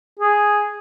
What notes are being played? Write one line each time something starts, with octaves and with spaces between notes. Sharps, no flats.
G#4